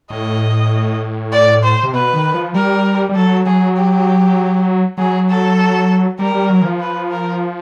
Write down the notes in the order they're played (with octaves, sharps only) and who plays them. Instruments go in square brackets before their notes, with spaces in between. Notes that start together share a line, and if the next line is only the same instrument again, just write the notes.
[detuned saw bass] A2 [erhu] D#5
[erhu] D5
C5
[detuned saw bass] C3
[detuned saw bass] B2 [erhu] B4
[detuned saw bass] D#3
F3
[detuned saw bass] G3 [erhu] A#4
[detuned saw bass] G3
[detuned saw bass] F#3 [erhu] A4
[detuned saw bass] F#3 [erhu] G#4
[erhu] G4
[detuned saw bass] F#3 [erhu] G#4
[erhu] A4
[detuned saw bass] G3 [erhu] A#4
[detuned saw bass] G3
F#3
E3
F3
[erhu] B4
A#4